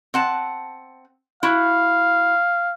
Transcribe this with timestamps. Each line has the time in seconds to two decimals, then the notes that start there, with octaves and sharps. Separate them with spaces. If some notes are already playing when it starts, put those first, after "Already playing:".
0.14 C4 F#5 A5
1.43 E4 F#4 F5